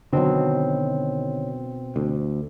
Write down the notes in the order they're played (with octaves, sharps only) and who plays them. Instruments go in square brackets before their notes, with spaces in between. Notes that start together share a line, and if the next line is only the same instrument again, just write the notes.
[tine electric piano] B2 C4 [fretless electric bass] D3 D#3 F#3
[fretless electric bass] D2